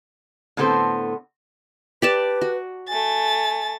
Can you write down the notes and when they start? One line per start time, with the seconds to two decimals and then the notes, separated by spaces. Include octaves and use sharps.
0.57 A2 D3 B3 C4 A4 C5
2.02 G4 B4 D5 A5
2.41 F#4
2.88 A3 G#5 A6